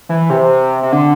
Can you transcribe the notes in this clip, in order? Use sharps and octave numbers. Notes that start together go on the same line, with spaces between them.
E3
C3
C3
D3